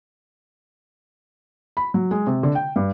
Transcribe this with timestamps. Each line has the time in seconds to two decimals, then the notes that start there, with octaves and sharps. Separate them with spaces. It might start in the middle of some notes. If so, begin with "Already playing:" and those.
1.77 B5
1.94 F#3
2.11 G#3
2.27 C3
2.43 D3
2.55 G5
2.76 G2